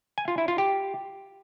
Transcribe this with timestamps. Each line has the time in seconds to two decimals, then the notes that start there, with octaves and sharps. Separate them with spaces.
0.18 G#5
0.28 F4
0.38 E4
0.48 F4
0.58 G4